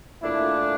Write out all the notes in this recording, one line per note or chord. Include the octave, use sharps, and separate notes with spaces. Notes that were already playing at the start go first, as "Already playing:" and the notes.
A#2 A3 D4 E4